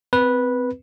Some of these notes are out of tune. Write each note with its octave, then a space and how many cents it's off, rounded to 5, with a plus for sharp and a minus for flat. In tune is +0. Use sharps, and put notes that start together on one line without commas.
C4 -30 B4 -10